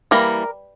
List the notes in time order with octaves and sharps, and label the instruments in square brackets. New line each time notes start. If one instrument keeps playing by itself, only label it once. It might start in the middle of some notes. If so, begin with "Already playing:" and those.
[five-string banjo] E3 G3 A#3 A#4